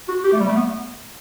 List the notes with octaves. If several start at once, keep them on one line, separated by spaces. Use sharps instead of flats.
F#4
G4
A3
G3
A3
B3